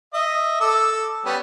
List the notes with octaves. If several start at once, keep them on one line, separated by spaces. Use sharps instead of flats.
D#5 E5
A4 D6 E6
G3 B3 C#4